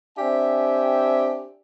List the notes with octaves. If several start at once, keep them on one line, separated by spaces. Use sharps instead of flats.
C4 D4 G4 E5 G5 G#5